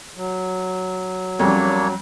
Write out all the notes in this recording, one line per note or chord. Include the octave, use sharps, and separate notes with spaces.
F#3
F2 G3 A#3 C#4 D4 C#5